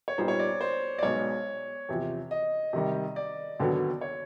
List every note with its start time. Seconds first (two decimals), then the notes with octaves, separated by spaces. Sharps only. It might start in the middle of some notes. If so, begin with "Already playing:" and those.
0.08 C#5
0.18 A#2 G3 B3 D#4 C5
0.28 C#5
0.40 D5
0.61 C5
0.99 D5
1.03 B1 B2 G#3 B3 C#5
1.89 E2 C3 F3
2.31 D#5
2.73 C3 D#3 G3
3.16 D5
3.60 D#2 D3 F#3 B3
4.01 C#5